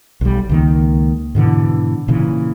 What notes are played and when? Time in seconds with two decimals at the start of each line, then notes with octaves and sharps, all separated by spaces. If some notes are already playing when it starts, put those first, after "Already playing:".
0.21 B1 G3
0.49 C#2 D#3 A#3
1.35 G#2 B2 D3 E3
2.08 A#2 C#3 E3